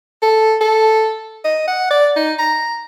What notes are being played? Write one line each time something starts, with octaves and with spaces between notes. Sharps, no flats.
A4
A4
D#5
F#5
D5
D#4
A#5